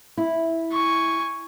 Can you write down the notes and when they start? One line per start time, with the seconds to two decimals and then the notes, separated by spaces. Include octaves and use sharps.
0.17 E4
0.72 G#5 C#6